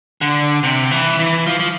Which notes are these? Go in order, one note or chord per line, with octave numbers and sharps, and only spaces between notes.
D3
C3
E3
E3
F3
F3